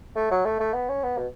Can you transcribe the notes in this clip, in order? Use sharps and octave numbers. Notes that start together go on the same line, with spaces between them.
A3
F#3
A3
A3
B3
C#4
B3
B2